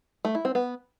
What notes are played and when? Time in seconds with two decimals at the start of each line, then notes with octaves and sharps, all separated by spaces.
0.25 A3
0.35 E4
0.45 C4
0.55 B3